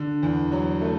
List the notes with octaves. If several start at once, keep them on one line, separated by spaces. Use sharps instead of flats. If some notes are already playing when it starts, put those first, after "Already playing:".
Already playing: D3
E2
F#3
A3